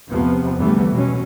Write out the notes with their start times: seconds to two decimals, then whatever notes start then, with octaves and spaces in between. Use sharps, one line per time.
0.10 E2 C3 F3 B3
0.58 E2 D3 E3 G3 A3 B3
0.91 B2 F#3 C#4